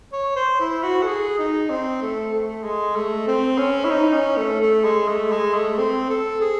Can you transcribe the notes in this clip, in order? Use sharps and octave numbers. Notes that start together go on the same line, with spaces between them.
C#5
C5
E4
F#4
A4
G#4
D#4
C4
A3
A3
G#3
A3
C4
C#4
E4
D#4
C#4
A3
A3
G#3
A3
G#3
A3
C4
A4
G#4